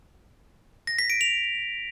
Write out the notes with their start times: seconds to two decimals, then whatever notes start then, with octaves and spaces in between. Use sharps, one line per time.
0.87 A#6
0.99 B6
1.10 D7
1.21 F7